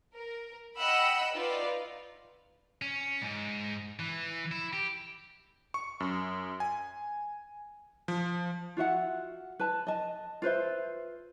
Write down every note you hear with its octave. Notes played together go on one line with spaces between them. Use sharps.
A#4
D#5 F#5 G5 B5 E6
D#4 F4 B4 D5 F5
C#4
G#2
E3
E4
G4
C#6
F#2
G#5
F3
F4 F#4 E5 F#5
B4 A5
D#5 A5
F4 B4 C5 E5